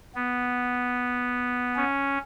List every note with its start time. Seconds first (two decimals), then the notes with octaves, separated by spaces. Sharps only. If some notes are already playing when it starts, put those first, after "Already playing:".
0.15 B3
1.76 C#4